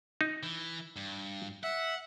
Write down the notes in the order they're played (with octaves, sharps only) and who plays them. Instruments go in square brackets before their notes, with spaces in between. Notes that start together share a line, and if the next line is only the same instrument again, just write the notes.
[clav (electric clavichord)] D#4
[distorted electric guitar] E3
G2
[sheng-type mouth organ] E5 [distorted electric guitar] F#5